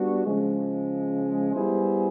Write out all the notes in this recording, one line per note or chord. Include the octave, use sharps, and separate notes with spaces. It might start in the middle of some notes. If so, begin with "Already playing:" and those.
Already playing: G3 B3 D4 F#4
C#3 F3 G#3
G3 B3 E4 G#4 C5